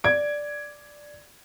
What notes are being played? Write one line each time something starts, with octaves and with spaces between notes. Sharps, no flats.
D5 G#6 D7